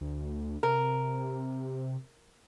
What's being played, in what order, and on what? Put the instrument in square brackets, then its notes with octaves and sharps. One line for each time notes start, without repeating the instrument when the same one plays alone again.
[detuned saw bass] D2
[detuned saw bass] C3 [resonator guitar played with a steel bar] A#4